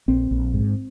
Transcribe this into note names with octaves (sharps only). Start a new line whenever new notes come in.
A#1 C4
A#1
G#2